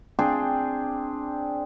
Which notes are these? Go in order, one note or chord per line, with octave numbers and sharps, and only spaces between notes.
C4 D4 G#4 G5